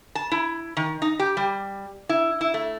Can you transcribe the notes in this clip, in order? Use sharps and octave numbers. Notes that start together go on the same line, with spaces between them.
A5
E4
D#3
D#4
G4
G3
E4
E4
A3